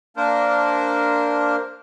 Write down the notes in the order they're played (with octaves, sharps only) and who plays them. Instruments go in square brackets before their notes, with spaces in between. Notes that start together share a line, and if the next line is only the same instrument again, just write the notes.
[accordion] A#3 D4 A#4 C5